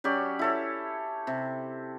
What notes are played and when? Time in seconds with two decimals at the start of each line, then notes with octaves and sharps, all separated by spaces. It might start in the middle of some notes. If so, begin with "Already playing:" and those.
0.04 F#3 C#4 G4 D5
0.39 E4 A4 C#5
1.27 C3